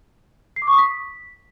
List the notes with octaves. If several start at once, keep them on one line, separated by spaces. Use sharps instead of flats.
C7
D6
C#6
D#6
B6